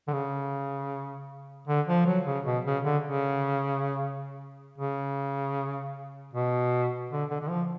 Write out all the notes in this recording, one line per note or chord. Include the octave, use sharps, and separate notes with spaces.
D3
C#3
D3
F3
F#3
C#3
B2
C#3
D3
C#3
C#3
B2
D3
D3
D3
F3